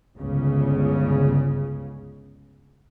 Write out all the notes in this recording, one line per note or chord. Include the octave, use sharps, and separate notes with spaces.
G1 C#2 C#3